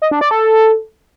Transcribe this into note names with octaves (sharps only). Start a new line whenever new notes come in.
D#5
D4
D5
A4